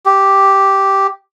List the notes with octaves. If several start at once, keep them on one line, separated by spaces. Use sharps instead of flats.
G4